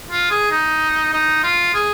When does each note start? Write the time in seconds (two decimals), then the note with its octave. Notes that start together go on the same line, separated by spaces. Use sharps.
0.11 F4
0.31 G#4
0.51 D#4
1.13 D#4
1.43 F4
1.74 G#4